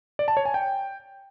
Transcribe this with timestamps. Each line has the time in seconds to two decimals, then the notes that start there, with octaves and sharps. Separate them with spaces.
0.19 D5
0.28 A5
0.37 C#5
0.45 G#5
0.54 G5